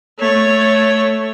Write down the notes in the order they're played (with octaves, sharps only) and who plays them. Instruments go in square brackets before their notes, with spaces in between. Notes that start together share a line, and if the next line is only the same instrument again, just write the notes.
[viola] A3 C#5